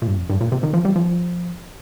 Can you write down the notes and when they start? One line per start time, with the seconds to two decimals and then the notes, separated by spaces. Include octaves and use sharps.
0.02 A#2
0.07 G2
0.17 F2
0.30 G2
0.41 A#2
0.52 C3
0.63 D#3
0.73 F3
0.85 G3
0.96 F3